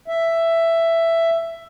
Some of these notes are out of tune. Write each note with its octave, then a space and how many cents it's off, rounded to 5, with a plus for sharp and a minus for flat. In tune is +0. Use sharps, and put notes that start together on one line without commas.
E5 +10